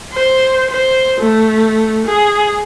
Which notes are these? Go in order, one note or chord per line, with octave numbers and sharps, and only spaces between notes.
C5
C5
A3
G#4